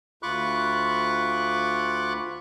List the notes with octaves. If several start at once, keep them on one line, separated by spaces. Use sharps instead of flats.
D2 F4 B5 C#6 D6 F#6